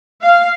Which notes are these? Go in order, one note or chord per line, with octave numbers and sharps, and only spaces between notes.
F5